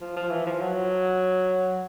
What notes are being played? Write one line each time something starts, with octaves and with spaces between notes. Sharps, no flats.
F3
F3
E3
F3
F#3